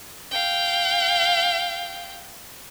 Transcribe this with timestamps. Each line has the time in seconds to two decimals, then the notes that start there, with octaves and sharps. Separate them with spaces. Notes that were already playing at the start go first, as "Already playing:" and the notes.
0.31 F5 G5